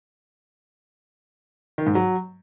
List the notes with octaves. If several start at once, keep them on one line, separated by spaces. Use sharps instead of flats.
D#3
G#2
F#3